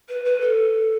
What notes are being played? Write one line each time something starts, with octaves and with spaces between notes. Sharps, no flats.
B4
B4
A4